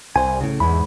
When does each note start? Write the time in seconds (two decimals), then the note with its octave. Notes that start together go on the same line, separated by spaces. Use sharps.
0.16 C2 C5 G#5
0.41 A2 C#3
0.60 E2 G#2 G#3 B5